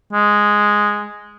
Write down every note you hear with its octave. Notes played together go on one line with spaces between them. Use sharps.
G#3